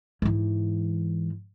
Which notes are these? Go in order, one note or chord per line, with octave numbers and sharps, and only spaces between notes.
G#2 E3